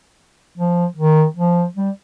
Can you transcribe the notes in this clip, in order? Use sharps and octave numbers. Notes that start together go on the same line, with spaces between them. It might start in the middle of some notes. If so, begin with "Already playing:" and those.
F3
D#3
F3
G3